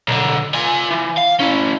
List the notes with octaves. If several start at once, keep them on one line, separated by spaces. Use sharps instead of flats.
B1 D3
F4 G#5
E3
F5
C#4 E4